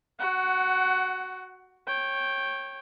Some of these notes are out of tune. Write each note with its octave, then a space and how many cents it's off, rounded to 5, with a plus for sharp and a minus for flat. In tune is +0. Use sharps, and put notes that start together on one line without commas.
F#4 +0 F#5 +20
C#5 -25 G5 +0